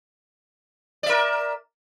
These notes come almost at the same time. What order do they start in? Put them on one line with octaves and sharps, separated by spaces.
D5 E5 A#4